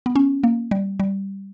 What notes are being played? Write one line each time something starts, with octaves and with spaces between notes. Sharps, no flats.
B3
C#4
A#3
G3
G3